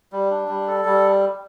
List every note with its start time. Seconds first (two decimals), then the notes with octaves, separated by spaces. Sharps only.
0.12 G3
0.31 D4
0.48 G3
0.68 A4
0.85 G3